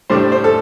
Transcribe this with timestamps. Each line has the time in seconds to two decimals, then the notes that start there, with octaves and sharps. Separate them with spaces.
0.10 A2 G3 D4 C5
0.32 C5
0.44 A4